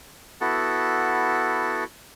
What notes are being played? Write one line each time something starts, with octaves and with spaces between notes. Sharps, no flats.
B3 E4 F#4 A4